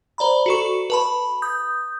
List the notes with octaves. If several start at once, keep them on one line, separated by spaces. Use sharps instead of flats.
C5 D5 A#5 B5
F#4 A4 C#6
B4 A5 B5
D#6 G6